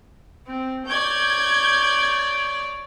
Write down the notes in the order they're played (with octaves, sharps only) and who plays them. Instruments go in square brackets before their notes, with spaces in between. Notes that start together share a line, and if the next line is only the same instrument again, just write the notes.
[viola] C4
[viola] C#5 D5 [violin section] G6 G#6